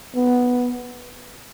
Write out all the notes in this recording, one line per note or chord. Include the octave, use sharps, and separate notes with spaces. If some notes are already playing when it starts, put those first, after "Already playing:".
B3